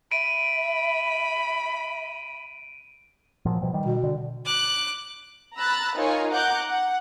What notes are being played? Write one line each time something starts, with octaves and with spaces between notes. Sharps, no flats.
E5 B5 D7 D#7
A#2 F3 F#3
B2 F3 G3
D#3 G3
B2
D3
D6 F#6
A#5 B5 E6 F#6 A6
D#4 F4 A#4 C#5 F5 G#5
F#5 A#5 D6 F#6 G6
F#5